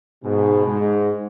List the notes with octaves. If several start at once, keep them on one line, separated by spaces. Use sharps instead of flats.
G#2 B2
G#2